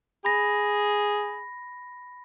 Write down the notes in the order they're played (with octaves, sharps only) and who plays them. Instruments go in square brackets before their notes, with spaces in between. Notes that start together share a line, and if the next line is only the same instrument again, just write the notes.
[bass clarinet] G#4 [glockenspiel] B5 A#6